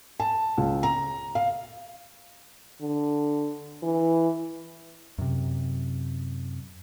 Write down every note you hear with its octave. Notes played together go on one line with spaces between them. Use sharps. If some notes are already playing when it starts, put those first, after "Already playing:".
A5
C#2
A#5
F5
D3
E3
F#2 C3